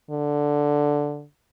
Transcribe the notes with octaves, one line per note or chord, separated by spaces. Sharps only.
D3